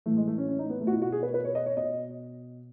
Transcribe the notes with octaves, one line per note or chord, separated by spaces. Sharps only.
A2 E3 A3
G#3
A3
C#4
C#4
D#4
B3
A3
F#4
B2 E4
F#4
G#4
B4
B4
C#5
D#5
C#5
B2 D#5